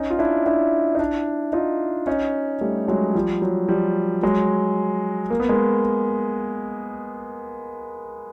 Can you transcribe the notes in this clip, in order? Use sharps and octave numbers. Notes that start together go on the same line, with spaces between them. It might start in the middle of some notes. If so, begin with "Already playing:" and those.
Already playing: C#4 D#4
F4
D4 E4
D4 E4
D#4
D4 E4
D#4 F4
C#4 D#4
G3 A3
F#3 G#3
F3 G3
F#3
F3 G3
F#3 G#3
A#3
B3
G#3 A#3